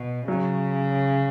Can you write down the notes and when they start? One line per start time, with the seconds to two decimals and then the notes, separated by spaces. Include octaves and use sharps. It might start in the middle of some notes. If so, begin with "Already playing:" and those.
Already playing: B2
0.28 C#3 F#3